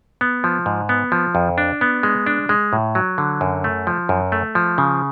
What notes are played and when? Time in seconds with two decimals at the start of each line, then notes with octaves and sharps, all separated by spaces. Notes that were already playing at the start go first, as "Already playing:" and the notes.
0.21 B3
0.44 F3
0.66 G#2
0.89 B3
1.12 F3
1.35 F2
1.58 D4
1.81 B3
2.03 G#3
2.26 D4
2.49 G#3
2.73 A2
2.95 F#3
3.18 D3
3.41 F#2
3.64 A3
3.87 F3
4.09 F#2
4.32 A3
4.55 F3
4.78 C#3